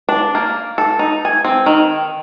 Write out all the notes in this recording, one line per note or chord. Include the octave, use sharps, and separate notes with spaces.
D4
A#3
A4
D#4
G#5
C4
D#3